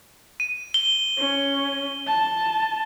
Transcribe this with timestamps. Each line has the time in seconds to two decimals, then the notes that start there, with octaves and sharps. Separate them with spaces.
0.40 D#7
0.74 G7
1.17 C#4
2.07 A5